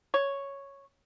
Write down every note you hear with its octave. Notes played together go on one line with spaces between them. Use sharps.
C#5